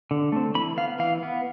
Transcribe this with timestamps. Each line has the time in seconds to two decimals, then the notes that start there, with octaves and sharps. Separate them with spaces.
0.11 D3
0.32 A3 C4
0.55 E3 B5
0.77 B3 F5
0.99 E3 F5
1.23 B3